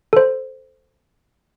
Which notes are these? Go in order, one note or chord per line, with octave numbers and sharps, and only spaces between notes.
A4 C5